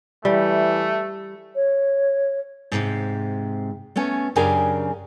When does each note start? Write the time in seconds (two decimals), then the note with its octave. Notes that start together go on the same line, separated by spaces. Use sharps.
0.25 E3 G3 A3
1.56 C#5
2.72 G#2 C3
3.96 A3 B3 C#4 G#5
4.36 F#2 C#3 D4 G4 A#4 G#5